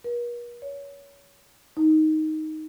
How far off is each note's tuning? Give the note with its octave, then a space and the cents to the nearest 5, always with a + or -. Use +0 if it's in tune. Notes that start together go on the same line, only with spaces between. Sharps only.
A#4 +45
C#5 +25
D#4 +5